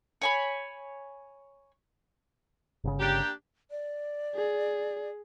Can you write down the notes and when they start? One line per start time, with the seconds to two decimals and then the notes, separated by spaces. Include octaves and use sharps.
0.21 C#5 G#5 B5
2.84 G1 A#2 C#3
3.00 A#3 D4 G4
3.71 D5
4.35 G#4